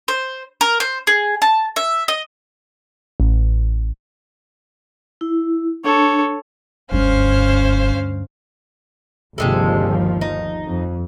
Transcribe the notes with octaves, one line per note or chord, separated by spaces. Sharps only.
C5
A#4
C5
G#4
A5
E5
D#5
A1
E4
D4 A4 C#5
F#1 D2 G2 C#4 C5 F5
G1 D#2 C3 F3 G#3 A4
D#4
F2